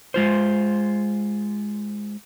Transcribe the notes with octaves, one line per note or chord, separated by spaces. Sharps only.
G#3 F4 C5